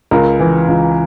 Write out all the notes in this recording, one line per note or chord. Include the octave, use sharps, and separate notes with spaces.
C#2 A#4
E3
C#2